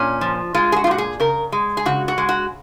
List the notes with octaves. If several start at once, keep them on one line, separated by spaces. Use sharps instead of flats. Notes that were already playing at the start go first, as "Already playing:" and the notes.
Already playing: A#2 C#4
F3
G#3 F4
G#4
F#4
F4
A#2 F#4
G#4
C#3 A#4
G#3
G#4
C#3 F#4
F#4
G#3
F#4